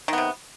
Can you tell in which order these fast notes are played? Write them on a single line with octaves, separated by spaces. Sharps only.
D#3 B3 C3